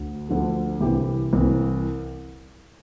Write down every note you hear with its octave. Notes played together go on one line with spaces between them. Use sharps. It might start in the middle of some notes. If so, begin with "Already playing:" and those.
Already playing: D2 D3
D2 D3 F3
C2 C3 E3 E4 G4
C2 C3 E3